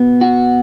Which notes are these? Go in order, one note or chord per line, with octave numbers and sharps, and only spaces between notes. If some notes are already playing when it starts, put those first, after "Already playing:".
Already playing: B2 B3
F#4